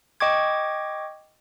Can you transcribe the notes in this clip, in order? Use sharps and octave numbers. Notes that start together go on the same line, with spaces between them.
D#5 G5 C#6 D6 G#6